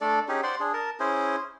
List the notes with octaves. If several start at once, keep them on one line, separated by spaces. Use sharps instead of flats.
A3 D4 A4 D5
C#4 D#4 G4 G#4
C5 D5 F#5 C6
D4 G#4
A#4 A5
C#4 E4 G#4 C5